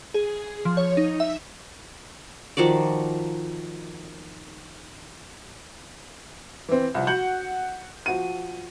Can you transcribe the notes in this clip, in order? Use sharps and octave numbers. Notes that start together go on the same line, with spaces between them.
G#4
F3
C#5
D#4
E5
D#3 F3 F#4 D5
E3 C4
C2 F3
F#4 F#5 G6 F#7
F3 F#4 D#7